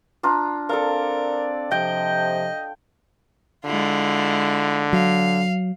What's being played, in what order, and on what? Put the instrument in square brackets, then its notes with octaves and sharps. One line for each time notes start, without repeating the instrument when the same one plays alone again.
[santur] D4 F4 A#5
[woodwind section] C4 D5 [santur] A4 F5 [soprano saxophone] A#4
[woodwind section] C3 F3 [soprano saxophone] D#5 [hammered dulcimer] G5
[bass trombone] D3 [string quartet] G#3 E4 F4
[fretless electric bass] F#3 [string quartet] F5